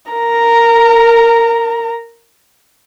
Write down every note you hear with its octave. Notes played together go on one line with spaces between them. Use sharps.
A#4 A#5